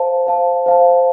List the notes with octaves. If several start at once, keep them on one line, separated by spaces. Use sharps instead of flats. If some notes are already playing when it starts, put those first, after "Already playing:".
Already playing: C5 F5 A5
C5 F5 A5
C5 F5 A5